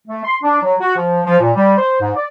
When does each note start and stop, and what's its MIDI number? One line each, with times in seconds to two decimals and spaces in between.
0.08 0.21 57
0.25 0.35 84
0.43 0.58 62
0.62 0.74 54
0.80 0.94 66
0.96 1.20 53
1.26 1.37 53
1.40 1.54 46
1.54 1.76 55
1.78 1.97 72
2.01 2.12 44
2.14 2.25 74